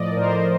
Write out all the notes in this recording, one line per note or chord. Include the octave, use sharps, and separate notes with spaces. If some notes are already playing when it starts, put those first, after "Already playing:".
Already playing: A2 F3 D5 D#5
A#4
A2 C5